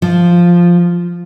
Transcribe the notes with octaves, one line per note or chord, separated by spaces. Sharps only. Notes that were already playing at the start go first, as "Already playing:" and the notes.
F3